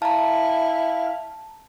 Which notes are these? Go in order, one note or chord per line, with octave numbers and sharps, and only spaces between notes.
E4 F5 A5 A#5